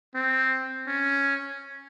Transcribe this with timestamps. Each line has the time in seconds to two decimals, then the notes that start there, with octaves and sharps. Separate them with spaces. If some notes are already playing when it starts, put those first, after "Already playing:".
0.15 C4
0.87 C#4